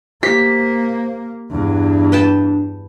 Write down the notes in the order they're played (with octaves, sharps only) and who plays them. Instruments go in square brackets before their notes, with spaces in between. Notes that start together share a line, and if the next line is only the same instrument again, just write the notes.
[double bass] A#3 [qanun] G4 [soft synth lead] C5 [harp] B6
[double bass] E2 G2 [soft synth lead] D4
[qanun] B4 G5 A5